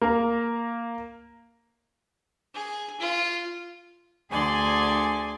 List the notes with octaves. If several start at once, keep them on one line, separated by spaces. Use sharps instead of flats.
A#3 A#5
G#4
F4
D2 D3 G#4 D5 G#5 C6